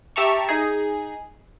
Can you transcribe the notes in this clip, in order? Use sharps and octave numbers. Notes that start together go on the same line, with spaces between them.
G4 E5 A5 A#5 C#6
D#4 G#4